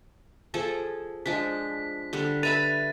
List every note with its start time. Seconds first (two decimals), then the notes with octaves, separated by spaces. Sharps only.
0.54 F3 G#4 A4
1.26 F3 G#3 D4 B6
2.13 D3 G3
2.43 B4 E5 B5 A6 D#7 F7